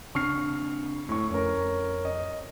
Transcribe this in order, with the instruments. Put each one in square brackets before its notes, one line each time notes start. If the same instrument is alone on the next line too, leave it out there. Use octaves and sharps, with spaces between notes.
[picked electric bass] C#3 C4 D4 [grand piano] C#6 F6 C7
[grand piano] A2 C#6
[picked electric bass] F2 [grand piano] C#4 A#4
[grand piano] D#5